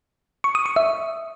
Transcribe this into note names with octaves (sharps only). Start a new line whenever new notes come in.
C#6
D#6
C#6
E5